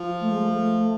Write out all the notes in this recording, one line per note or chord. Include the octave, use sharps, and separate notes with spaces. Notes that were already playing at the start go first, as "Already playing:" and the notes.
Already playing: F3
A3
G#3
A3